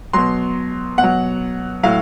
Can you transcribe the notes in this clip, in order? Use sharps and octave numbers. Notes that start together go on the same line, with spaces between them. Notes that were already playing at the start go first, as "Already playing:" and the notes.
B2 F#3 C6
B2 F#5
F#3
A2 F#3 F5